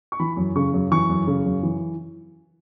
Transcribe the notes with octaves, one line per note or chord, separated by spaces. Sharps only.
C#6
E3 B5
F#2
C#3 C#6
F#2
E3 C#6
F#2
C#3
F#2
E3